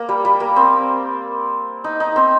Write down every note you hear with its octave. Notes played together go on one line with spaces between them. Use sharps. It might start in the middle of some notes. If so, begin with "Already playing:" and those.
Already playing: A#3
G3
G3
A#3
C4
D#4
D#4
C4